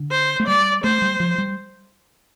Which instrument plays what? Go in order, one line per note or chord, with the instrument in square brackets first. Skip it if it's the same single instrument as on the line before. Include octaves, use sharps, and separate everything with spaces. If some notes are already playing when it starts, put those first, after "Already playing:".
Already playing: [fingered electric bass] D3
[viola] C5
[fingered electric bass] A3
[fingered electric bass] G3 [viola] D5
[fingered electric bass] A3 [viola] C5
[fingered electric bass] G3
F3
G3